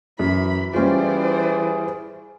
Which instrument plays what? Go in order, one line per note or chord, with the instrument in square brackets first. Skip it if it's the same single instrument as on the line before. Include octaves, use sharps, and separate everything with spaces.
[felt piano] F#2 [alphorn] E3 [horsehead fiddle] B5
[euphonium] E3 [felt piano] G3 C#4 F4 [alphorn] G#4 [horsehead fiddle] C5 D5